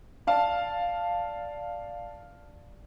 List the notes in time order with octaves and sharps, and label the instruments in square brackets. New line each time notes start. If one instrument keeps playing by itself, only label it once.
[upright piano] D5 F5 A5